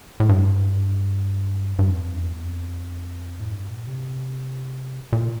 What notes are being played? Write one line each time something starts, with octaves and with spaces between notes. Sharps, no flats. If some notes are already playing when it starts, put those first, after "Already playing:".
A2
G2
G2
F2
E2
F2
A2
G2
A#2
C3
A#2